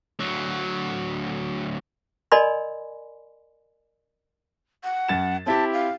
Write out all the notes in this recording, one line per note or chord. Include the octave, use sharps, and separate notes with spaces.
D2 F#3
A#4 D5 D#5 G#5 B5 C6
F#5
F#2 A6 E7
C4 E4 G4 A5
F5